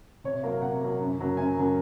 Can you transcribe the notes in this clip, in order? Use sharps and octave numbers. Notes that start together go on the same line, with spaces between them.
C3 C#5
F#3 A#3 F5
C3 F#5
F#3 A#3
F#2
C#3 F#3 A#3
F#2 G#5
C#3 F#3 A#3